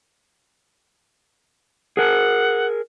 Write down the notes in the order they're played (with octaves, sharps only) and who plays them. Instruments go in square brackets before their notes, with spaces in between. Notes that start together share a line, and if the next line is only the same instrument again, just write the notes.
[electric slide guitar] G#4 A#4 [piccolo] F#5